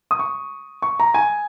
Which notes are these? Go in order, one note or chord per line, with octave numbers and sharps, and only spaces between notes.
D#6
C#6
C#6
A#5
G#5